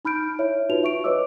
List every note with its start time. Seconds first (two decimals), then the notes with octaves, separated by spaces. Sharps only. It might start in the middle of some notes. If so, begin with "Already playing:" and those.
0.05 D#4 B5 F6 G6 D7
0.39 E4 C#5 E5
0.69 D#4 F4 F#4 B4 F7
0.83 E5 C#6 D7
1.04 B4 C#5 D#5 D6 E6